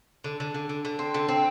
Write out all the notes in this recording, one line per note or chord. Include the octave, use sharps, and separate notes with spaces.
D3
D3
D3
D3
D3
C4
D3
C4